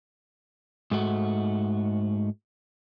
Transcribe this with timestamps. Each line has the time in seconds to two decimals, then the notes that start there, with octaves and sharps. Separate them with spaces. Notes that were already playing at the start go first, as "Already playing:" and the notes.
0.91 G#2 A3 F#4